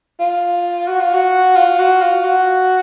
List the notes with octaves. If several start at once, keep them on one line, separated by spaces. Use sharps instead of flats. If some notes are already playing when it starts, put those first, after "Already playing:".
F4
F#4
F4
F#4
F4
F#4
F4
F#4